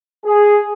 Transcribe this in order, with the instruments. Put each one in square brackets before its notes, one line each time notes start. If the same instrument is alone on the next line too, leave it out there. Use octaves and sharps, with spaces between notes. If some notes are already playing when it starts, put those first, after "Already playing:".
[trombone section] G#4